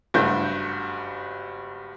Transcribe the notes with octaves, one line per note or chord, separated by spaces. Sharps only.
F#1 G2 A3 F#4 G6